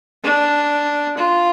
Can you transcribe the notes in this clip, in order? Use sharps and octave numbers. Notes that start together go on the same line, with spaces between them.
D4
F4